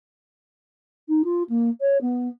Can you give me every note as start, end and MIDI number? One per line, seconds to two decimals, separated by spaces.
1.09 1.22 63
1.24 1.43 65
1.49 1.69 58
1.81 1.98 73
2.01 2.28 59